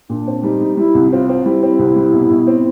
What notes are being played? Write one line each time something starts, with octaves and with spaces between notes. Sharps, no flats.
A#2 D4
C4
G3 D#4
G3
G3 E4
C2
C4 F4
C4
G3 E4
C4
C2
G3
B2
B2
C4